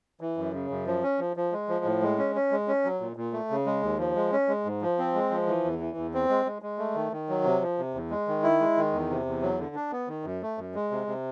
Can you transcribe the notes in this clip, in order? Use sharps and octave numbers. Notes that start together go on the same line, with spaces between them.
E3
F#2
C#3
F#2
F3
C#4
F3
F3
G#3
F3
A2
G#3
C#4
C#4
G#3
C#4
F#3
A#2
A#2
A3
C#3
G#3
D#2
F3
G#3
C#4
G#3
G#2
F3
C4
G#3
F3
E3
E2
E3
E2
C4
G#3
G#3
G#3
A3
D#3
D#3
F#3
C3
F3
C3
E2
G#3
D#3
E4
G#3
D#3
E2
C3
E2
F#3
D3
D4
B3
D#3
F#2
A3
F#2
G#3
C3
C3